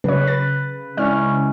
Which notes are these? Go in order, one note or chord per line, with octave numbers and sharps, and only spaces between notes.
C#3 F#3 B4 C#5
B4 A6
G#3 C#4 E4 D5 F6